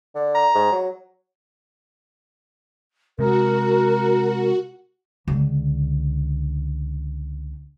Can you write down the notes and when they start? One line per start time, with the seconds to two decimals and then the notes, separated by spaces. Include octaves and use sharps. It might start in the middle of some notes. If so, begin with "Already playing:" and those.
0.15 D3
0.35 A#5
0.55 G#2
0.72 F#3
3.19 C3 G#3 F#4 A#4
5.28 C#2 D3